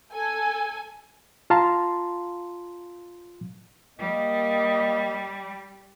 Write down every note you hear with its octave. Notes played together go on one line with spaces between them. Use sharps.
A4 G#5
F4 F5 A5 A#5 C6
G3 A#3 D#5